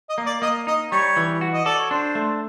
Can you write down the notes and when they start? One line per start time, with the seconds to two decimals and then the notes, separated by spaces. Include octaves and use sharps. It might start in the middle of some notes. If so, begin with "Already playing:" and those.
0.10 D#5
0.18 A#3
0.26 D5
0.42 A#3 D#5
0.67 D#4 D#5
0.92 G3 C#5
1.16 E3
1.41 F#4
1.53 D#5
1.65 A4 D5
1.79 C#5
1.91 D4 C5
2.15 A3